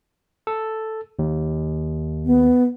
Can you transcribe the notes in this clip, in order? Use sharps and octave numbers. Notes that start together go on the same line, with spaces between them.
A4
D#2
B3